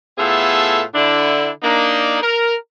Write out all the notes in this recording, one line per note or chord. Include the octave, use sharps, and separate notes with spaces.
A2 B3 F4 G#4 A4 E5
D3 D4 E4
A#3 D4 D#4
A#4